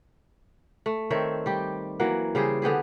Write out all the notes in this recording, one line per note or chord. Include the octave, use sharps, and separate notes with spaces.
A3
D#3 C4 C#5 E5
G3 G4
E3 F#3 A#3 F#5
C#3 G3 G#4 C5
D3 B3 G4 G#4